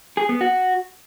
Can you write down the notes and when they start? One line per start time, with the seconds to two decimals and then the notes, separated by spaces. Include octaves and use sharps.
0.17 G#4
0.29 B3
0.41 F#4